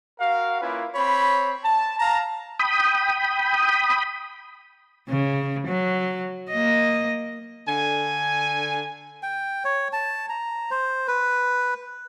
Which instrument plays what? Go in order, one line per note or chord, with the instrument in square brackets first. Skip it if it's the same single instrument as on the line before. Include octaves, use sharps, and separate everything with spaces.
[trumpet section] F#4 A#4 F5
A#3 C#4 E4 F4 B4
C4 C#5 B5
A5
F5 A5 A#5
[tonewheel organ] G5 B5 D#6
[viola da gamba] C#3
F#3
A#3 D#5
[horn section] D3 G#5
[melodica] G5
C#5
A5
A#5
C5
B4